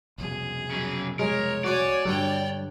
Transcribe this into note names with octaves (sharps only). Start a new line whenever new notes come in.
C2 F2 B2 G#4
C#3 F#3
G#3 A#4 C#5
F#4 C#5 D5 G#5
G2 D3 G3 C#5 G5